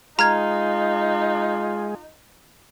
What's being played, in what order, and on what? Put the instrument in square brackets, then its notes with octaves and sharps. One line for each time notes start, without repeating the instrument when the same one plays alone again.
[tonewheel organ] G#3 G#4 [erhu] D#4 [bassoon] F4 [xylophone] A#5 F6 G#6